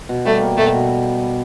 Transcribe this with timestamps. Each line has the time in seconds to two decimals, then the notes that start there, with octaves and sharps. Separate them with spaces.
0.09 B2
0.25 G3 A3
0.41 A#3
0.57 B2 A3
0.74 B2